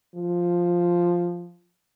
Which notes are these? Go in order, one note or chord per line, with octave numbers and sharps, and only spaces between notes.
F3